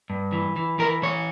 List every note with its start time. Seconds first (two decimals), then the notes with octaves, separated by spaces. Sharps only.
0.10 G2
0.33 E3
0.56 E3
0.79 E3 A#4
1.03 E3 C#5